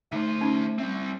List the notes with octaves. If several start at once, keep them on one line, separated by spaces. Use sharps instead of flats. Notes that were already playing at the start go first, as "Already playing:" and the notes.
D3 A3 D#4 C5
C#4 D#4
G3 C4